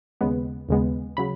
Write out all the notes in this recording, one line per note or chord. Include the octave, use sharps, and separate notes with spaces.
D#2 C#3 G#3 B3
D#2 C#3 G#3 B3
C#3 F#3 B5